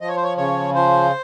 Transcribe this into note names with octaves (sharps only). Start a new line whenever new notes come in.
F3 D#5
C#5
C5
C#5
C#3 C#5
F3 C5